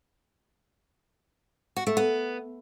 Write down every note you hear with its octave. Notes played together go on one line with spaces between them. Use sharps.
F#4
A3
B3